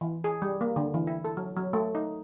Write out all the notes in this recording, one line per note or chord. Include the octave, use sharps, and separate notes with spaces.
E3
G#4
G3
A#3
D3
E3
E4
A4
F#3
F#3
A3
D#4